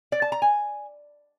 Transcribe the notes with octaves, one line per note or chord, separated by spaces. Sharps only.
D5
A5
A#5
G#5